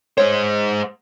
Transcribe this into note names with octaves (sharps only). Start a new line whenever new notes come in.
G#3 C5 C#5